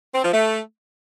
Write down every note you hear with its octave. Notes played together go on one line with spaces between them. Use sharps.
C4
F3
A3